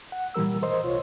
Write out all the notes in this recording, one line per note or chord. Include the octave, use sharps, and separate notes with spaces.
F#5
A#2 E3 G3 A#4 E6
A#4 C5 D#5
C2 F4 C#5